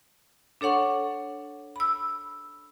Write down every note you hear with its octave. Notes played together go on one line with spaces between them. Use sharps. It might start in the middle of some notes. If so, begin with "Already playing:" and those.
D4 A4 C#5 F#5 C#6
B5 E6